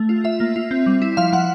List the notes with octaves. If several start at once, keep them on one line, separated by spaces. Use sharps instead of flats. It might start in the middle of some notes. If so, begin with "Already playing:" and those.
Already playing: A3
F4
F4 E5
A#3
F4
C4
G3
E4
F3 F5
F3 F#5